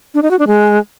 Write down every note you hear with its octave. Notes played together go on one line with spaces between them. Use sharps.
D4
D#4
F#4
D4
G#3